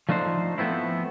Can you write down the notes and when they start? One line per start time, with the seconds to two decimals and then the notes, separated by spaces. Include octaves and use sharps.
0.09 F3 A3 D4 D#4 C5
0.58 F3 A3 B3 C4 E4